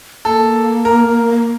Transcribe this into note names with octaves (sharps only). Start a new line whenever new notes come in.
A#3 A4
A#4